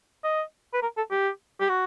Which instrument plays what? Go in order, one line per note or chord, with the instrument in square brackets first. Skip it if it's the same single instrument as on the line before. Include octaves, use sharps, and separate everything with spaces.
[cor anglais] D#5
B4
A#4
A4
G4
G4
F#4